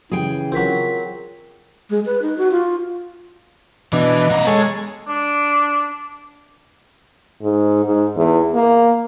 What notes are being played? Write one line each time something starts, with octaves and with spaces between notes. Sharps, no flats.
C#3 E3 G#4 G5
F#3 C4 F4 A#4 B6
G#3
B4
D#4
F#4
F4
B2 E3 D4 D#5
B3 A#4
G#3 G#4 A4 C#5
D4
G#2
G#2
E2
A#3